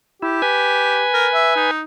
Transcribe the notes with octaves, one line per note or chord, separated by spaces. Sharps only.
E4 G4
B4 G#5
A#4
E5
D#4